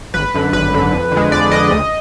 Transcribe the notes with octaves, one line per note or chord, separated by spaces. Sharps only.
G#1 B4
F#2 D3
G#1 B4
F#2 D3
F2
D3 G#3
F2 D5
D3 G#3 D#5
D2